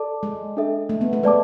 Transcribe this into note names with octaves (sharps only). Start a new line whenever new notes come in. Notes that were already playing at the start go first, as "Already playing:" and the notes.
Already playing: A4 D5 A5 D6
G#3
D4 A4 E5
A3
B3
A3
G#3 B4 D5 A5 D6